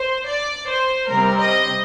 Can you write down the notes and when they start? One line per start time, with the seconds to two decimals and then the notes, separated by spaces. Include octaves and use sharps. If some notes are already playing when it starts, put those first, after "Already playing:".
Already playing: C5
0.26 D5
0.68 C5
1.10 C3 G3 C4 A#4
1.39 D#5